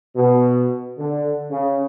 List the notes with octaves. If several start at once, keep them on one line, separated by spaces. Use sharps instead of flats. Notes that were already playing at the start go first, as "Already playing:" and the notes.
B2
D3
C#3